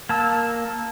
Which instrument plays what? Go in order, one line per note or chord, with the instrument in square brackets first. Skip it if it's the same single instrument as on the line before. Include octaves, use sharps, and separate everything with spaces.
[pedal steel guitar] A#3 A5 E6